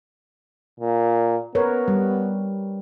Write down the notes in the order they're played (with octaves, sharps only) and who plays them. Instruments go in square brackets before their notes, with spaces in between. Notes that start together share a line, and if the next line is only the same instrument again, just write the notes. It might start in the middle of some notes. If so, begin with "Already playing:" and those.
[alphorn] A#2
[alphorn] B3 [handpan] A#4 B4 C#5
[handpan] G3